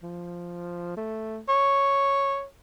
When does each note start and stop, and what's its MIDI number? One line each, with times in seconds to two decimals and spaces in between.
0.03 0.95 53
0.97 1.39 57
1.49 2.44 73